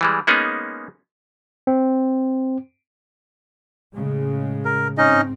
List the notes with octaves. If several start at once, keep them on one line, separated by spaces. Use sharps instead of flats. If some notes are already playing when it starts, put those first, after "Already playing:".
E3 G3 G#3
G#3 A#3 B3 C#4 D#4 G#4
C4
A2 C#3 G#3
A#4
G#2 C4 C#4 D#4 D#5